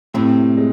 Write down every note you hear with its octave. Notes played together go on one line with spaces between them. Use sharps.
A2 C3 C4
G#3